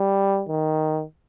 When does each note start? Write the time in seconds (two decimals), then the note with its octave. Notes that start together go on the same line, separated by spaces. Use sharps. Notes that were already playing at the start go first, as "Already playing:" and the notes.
Already playing: G3
0.49 D#3